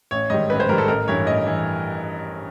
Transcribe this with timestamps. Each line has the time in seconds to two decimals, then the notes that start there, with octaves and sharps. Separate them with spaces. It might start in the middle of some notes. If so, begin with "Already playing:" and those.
0.11 A1 C#5
0.30 G#2 D#3 G3 D#5
0.50 A1 B4
0.60 C5
0.69 G#2 D#3 G3 A#4
0.78 A4
0.88 A1 A#4
1.08 G2 E3 C#5
1.27 A1 D#5
1.46 E3